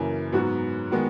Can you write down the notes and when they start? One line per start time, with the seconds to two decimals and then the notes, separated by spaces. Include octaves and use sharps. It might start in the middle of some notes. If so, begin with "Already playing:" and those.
Already playing: F#2 C#3 E3 A#3
0.32 G#2 F#3 B3 F#4
0.91 D#3 G#3 B3 F#4